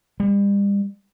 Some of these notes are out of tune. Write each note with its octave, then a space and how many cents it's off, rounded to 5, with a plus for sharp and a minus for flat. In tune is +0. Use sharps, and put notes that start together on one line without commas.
G3 +40